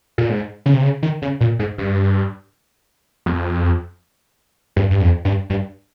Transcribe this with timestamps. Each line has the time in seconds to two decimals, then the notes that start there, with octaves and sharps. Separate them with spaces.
0.18 A#2
0.29 G#2
0.66 C#3
0.74 C3
0.82 C#3
1.03 D#3
1.22 C#3
1.41 A#2
1.59 G#2
1.78 G2
3.26 F2
4.76 G2
4.91 G2
5.01 F2
5.25 G2
5.50 G2